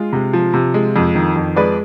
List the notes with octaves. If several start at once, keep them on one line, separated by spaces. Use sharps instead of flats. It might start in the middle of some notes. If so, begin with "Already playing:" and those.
Already playing: G#3 F4 G#4
C3
F3
C3
G#3
F2
D#3
F2
G#3 B4 D5